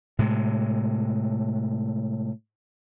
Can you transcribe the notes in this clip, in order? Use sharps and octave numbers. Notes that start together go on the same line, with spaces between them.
A2 C3 G#3